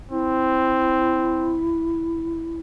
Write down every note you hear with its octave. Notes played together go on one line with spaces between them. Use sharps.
C4 E4